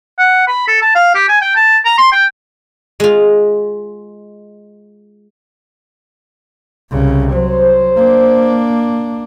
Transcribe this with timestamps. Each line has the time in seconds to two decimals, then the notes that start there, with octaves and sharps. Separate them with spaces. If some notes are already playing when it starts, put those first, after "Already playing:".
0.18 F#5
0.48 B5
0.68 A4
0.82 A5
0.95 F5
1.15 G4
1.29 G#5
1.42 G5
1.56 A5
1.85 A#5
1.98 C6
2.12 G5
3.00 G#3 F4
6.91 C2 C#3
7.33 F#3 C5
7.97 A#3 D4